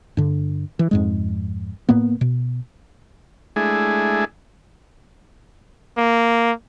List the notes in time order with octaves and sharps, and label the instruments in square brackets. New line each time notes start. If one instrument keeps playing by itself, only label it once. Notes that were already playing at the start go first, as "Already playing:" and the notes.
[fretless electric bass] G2 D3
E3
F2 G#2 G#3
A2 A#3 B3
B2
[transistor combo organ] G#3 A3 D4 E4 G#4
[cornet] A#3